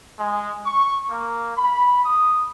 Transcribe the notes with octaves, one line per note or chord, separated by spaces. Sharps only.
G#3
C#6
A#3
B5
D#6